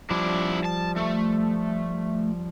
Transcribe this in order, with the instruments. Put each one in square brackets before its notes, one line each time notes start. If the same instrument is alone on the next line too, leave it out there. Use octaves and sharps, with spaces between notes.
[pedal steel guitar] F3 G3 [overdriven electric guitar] D4 E4
[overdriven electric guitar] A5
A3